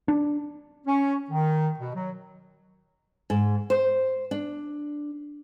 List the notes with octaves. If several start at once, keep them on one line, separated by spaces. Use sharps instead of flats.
D4
C#4
D#3
B2
F#3
G#2
C5
D4